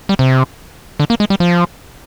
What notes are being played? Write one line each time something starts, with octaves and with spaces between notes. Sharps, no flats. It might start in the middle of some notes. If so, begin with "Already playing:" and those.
G3
C3
D3
A#3
G#3
G3
F3